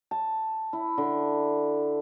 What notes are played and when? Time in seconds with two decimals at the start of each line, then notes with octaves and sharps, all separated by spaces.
0.11 A5
0.73 E4
0.98 D3